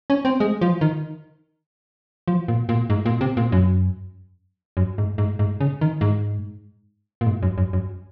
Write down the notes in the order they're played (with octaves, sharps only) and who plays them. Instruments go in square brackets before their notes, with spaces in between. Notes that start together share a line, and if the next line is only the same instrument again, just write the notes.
[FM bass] C#4
C4
G#3
F3
D#3
F3
A#2
A#2
G#2
A#2
C3
A#2
F#2
F#2
G#2
G#2
G#2
C#3
D#3
G#2
A#2
G#2
F#2
F#2
F#2